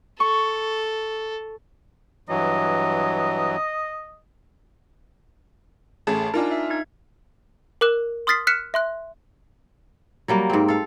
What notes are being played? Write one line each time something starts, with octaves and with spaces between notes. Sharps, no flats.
A4 C#6
G2 E3 F#3 D#5
A1 A3 G#4 A5
D4 D#4 F4 A#4 G#5
E5
D#4 G#6
A#4 D6 F#6 E7
C6 D#6 F6 A6 B6 C7
F6 F#6 B6 C#7 E7
E5 C6 F#6
F#3 G3 A#3
G#2 C4
A4 F5